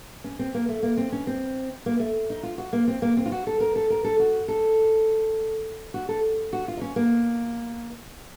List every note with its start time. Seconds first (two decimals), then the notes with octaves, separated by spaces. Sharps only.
0.24 C#4
0.39 C4
0.54 A#3
0.69 A3
0.83 A#3
0.97 C4
1.12 C#4
1.27 C4
1.86 A#3
1.99 A3
2.30 D#4
2.43 F4
2.58 F#4
2.73 A#3
2.88 C4
3.02 A#3
3.17 C4
3.26 F4
3.32 F#4
3.47 A4
3.60 A#4
3.76 A4
3.90 A#4
4.04 A4
4.20 F#4
4.48 A4
5.94 F#4
6.09 A4
6.53 F#4
6.68 F4
6.77 D#4
6.81 C#4
6.96 A#3